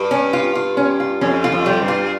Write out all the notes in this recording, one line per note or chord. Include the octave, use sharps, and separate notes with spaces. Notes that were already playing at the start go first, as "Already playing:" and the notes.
Already playing: G2
C#4
F4
F4
C#4
F4
F2 C#4
F4
F2
G3
G2
F4